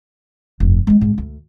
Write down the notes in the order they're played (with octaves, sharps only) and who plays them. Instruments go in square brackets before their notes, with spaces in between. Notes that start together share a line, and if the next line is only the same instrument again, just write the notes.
[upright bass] F1 G2
G#3 B3
G#1 G#2
D2